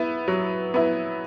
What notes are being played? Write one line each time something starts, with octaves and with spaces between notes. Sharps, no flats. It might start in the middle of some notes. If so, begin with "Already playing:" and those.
Already playing: B3 E4
F#3
B3 E4